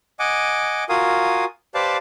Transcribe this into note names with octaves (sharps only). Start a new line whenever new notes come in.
D#5 F#5 G#5 D6
F4 F#4 A#4 F5 G#5 D#6
G4 B4 C5 D5 F5 A5